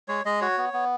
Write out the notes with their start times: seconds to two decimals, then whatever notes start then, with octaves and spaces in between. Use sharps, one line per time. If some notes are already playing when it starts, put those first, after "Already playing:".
0.08 G#3 C#5
0.25 G#3 D#5
0.41 F#4 C#5
0.58 B3
0.73 B3